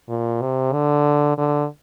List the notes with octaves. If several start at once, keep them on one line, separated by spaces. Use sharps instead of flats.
A#2
C3
D3
D3